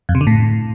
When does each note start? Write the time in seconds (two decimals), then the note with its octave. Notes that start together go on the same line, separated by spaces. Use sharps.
0.09 F2
0.15 C3
0.21 D3
0.27 A2